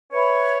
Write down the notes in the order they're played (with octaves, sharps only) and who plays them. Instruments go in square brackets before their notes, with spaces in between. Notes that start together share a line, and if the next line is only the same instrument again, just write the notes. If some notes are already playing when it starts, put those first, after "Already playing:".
[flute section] B4 E5 B5 [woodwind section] C#5